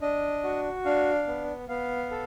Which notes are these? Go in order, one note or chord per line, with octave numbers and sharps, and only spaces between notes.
D4 D#5
F#4
D4 F5
B3
B3 F5
A4